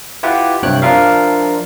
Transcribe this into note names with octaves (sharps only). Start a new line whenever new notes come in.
E4 F4 G4 B4 F#5
G2 C3 C#5 G5 F#6
F3 D4 F4 A#4 E5 F5